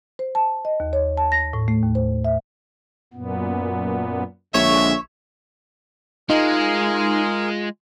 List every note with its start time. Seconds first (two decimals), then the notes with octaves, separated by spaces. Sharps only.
0.19 C5
0.35 A5
0.65 D#5
0.80 D#2
0.93 C#5
1.17 A5
1.32 A#6
1.53 A2
1.68 A3
1.83 D#2
1.95 C5
2.25 E5
3.14 F#2 A#2 B3
4.54 A#1 D3 G#3 C#5 E5
6.30 G#3 D#4 F4 G#4 A#4